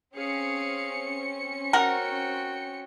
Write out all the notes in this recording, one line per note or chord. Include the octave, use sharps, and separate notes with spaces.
C4 C#4 G#4 F5 C#7
F#4 A#4 F#5 G5